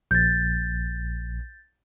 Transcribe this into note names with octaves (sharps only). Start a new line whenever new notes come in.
A#1 G6 A6